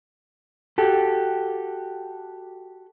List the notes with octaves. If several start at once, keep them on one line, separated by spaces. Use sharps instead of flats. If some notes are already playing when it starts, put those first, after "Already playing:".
F#4 G4 A4